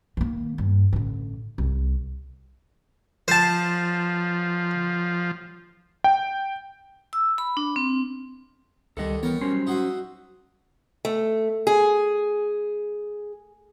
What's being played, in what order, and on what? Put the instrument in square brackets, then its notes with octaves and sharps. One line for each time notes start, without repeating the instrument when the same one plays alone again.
[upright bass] D#3 A#3
G2
A1 D3
C2
[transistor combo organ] F3 [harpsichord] C5 A5
[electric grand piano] G5
[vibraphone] E6
B5
D4
C4
[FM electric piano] C#2 G3 [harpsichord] D3 D#3 [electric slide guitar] A4 D#5
[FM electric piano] E3 [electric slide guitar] B3 [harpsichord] G4 A#4 C#5
[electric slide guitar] F#3 C#4 C5 [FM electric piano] G3 C6 C7
[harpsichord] D#4 F#4 E5
[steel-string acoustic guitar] A3
G#4